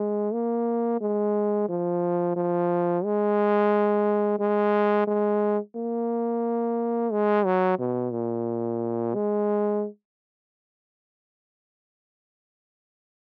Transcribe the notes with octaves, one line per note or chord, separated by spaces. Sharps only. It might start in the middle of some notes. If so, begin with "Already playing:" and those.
Already playing: G#3
A#3
G#3
F3
F3
G#3
G#3
G#3
A#3
G#3
F#3
B2
A#2
G#3